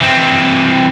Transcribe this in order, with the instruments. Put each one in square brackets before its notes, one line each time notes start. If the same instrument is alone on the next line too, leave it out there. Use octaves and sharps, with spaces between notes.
[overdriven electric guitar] E3 C4